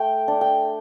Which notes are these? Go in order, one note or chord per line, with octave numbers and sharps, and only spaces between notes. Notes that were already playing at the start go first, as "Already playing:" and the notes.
Already playing: A3 G5
D4
G5